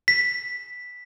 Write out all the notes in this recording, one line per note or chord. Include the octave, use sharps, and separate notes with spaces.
B6